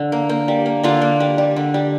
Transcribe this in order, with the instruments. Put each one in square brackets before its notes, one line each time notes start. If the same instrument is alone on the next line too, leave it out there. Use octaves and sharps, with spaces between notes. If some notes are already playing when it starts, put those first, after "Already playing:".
Already playing: [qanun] D3
A#3
A#3
G3
A#3
D3 D4 F4
A#3
G3
G3
D3
G3